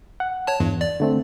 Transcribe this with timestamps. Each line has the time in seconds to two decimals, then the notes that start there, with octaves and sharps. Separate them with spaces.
0.20 F#5
0.47 C#5 A5
0.60 E2 G2
0.81 D5
1.00 D3 A3 C4